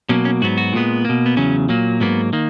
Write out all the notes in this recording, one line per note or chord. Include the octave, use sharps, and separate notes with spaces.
B2 F#3 A#3 C#4
C#4
G#2 F#3 B3 F#4
F#4
A#2 G#3 B3
B2 A#3
B3
E2 C#3 F#3 C#4
A#2 F#3 A#3
G#2 F#3 A#3 B3
D#3 A#3